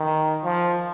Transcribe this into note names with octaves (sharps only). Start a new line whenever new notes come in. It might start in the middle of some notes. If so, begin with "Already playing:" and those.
Already playing: D#3
F3